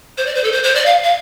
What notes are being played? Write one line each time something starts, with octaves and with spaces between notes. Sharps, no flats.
C5
D5
C5
A4
C5
C5
D5
F5
F5